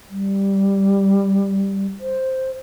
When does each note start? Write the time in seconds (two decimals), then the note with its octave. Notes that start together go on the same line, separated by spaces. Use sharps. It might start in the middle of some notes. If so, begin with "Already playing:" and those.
0.10 G3
2.00 C5